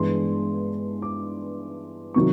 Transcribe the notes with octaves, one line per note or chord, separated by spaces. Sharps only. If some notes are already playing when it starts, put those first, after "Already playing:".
Already playing: G2 E3 G#3 B3 D4 C6
D6
C3 D#3 F#3 C#6